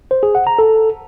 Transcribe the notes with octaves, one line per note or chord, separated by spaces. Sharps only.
C5
G#4
F#5
A#5
A4